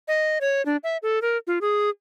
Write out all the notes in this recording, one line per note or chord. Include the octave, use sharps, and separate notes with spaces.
D#5
C#5
D4
E5
A4
A#4
F4
G#4